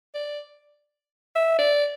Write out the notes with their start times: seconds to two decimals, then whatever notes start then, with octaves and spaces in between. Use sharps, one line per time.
0.15 D5
1.36 E5
1.59 D5